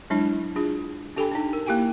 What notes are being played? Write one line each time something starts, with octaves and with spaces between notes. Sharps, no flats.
F#3 G#3 D4 E4
D4 F4 G#4
D4 G4 A4 G5 G#5 B5
D4 D#4
A#4
A#3 E4 G4 G5 G#5